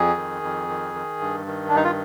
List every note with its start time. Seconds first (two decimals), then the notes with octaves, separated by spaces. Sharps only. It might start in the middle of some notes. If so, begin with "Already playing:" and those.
Already playing: F2 G#4
0.17 D#3
0.42 F2
0.68 D#3
0.95 D#3
1.20 G2
1.47 D#3
1.69 D4
1.73 G2 D#4
1.84 F4